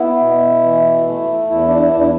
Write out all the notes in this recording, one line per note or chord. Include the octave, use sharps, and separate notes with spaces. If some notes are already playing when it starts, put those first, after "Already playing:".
Already playing: B3 E4
B2
E3
A3
E2 E4
D4
E4
E2 D4
E4